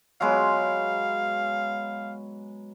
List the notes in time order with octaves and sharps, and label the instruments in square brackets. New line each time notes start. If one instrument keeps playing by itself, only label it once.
[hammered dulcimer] F#3 G#3 B3 [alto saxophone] F5